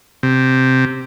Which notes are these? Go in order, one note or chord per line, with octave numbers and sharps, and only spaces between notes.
C3